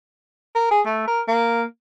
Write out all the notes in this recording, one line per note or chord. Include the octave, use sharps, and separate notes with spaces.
A#4
G#4
A3
A#4
A#3